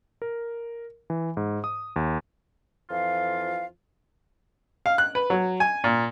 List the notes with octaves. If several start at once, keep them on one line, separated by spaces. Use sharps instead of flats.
A#4
E3
G#2
D#6
D#2
F2 E3 F3 F4 F5
F5
F#6
B4
F#3
G#5
A#2